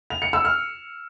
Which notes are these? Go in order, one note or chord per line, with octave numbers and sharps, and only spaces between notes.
F7
C#7
E6
F6